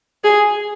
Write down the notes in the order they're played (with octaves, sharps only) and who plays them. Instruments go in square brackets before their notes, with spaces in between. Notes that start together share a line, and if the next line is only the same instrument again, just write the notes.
[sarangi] G#4